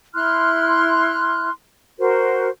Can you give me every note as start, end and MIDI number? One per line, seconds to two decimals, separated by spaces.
0.15 1.50 64
0.15 1.50 84
0.15 1.50 89
0.15 1.50 90
1.98 2.48 66
1.98 2.48 70
1.98 2.48 72